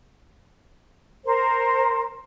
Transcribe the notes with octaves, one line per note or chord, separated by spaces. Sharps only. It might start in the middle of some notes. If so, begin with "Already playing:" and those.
A#4 C5